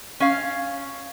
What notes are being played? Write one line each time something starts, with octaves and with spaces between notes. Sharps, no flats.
C#4 F5